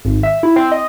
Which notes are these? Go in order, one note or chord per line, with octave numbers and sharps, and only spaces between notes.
G#1
E5
E4
C4
D#5